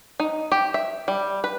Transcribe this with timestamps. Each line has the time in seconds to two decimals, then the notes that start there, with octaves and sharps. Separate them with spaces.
0.20 D#4
0.52 G4
0.74 E5
1.08 G3
1.44 B4